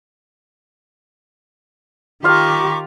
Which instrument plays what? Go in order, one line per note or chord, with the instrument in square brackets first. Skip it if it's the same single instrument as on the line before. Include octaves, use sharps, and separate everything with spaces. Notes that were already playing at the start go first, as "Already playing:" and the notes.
[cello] D#3 G4 [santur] F4 F5 [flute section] A#5 C#6 D6